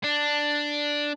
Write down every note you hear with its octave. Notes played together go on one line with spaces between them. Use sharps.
D4